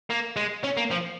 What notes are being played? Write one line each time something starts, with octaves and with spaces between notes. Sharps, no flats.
A#3
G#3
C#4
A#3
F3